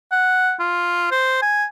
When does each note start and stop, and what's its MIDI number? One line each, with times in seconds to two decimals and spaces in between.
0.12 0.54 78
0.59 1.08 65
1.11 1.40 72
1.42 1.65 80